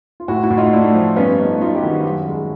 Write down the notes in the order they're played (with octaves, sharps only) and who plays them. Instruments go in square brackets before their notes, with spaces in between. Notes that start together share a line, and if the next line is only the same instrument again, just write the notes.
[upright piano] F4
A2 E4 F#4
E4 F#4
A2
D#4 F4
A3 D4 E4
F3
G2 B3 C#4
A3 C#4 D#4
F#3 D#4 F4
G4
D#3 E4 F#4
F#2
G#3